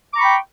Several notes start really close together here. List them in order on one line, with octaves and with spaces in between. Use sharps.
D6 A#5 C#6 B5 G5